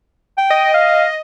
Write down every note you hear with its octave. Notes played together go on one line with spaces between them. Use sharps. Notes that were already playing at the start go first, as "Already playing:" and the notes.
G5
D#5
F5